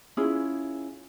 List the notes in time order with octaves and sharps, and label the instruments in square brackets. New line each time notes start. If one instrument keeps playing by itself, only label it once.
[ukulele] C#4 E4 F4 G#4